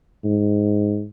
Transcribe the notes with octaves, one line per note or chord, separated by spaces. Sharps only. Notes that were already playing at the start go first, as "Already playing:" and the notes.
G#2